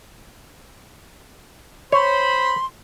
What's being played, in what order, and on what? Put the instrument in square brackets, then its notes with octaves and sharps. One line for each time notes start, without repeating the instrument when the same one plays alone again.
[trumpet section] C5 B5 [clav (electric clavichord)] C#5 [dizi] C6